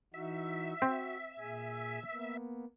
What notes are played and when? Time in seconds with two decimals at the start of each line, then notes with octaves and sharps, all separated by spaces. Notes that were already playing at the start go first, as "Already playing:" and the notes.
0.14 E3 D#4 F#4 E5
0.82 C4 F#4
1.39 A#2 G#4 G#5
2.11 A#3 B3